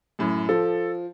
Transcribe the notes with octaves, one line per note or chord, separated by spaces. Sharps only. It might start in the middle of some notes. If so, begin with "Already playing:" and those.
F#2 A2
F3 A4